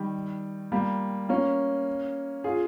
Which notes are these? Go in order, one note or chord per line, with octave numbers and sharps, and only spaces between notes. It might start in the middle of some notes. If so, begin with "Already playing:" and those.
Already playing: D#3 G3
G3 A#3
A#3 C#4
F4 G#4